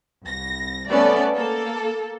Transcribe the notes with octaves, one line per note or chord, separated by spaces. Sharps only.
C2 A#6
A3 B3 C#4 A4 D5
A#3 A4